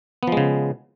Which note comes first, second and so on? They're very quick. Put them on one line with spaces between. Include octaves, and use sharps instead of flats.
B3 F3 G#3 C#3